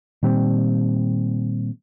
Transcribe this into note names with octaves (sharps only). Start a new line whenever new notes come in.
A#2 D#3 G3 C4